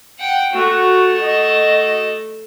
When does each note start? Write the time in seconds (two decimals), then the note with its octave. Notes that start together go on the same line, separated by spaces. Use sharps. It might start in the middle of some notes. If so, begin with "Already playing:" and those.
0.19 F#5 G5
0.53 A3 F#4
1.19 F#4 D#5